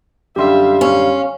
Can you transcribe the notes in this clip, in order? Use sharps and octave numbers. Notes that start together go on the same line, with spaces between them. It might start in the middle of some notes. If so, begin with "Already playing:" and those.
F#2 D3 G3 G4 E5 F5 C6
C#4 F5